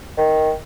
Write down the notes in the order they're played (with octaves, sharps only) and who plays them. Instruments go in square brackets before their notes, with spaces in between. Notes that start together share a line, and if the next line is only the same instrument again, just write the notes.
[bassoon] D#3